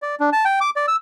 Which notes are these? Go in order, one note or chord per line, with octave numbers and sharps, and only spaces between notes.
D5
D4
A5
G5
D6
D5
E6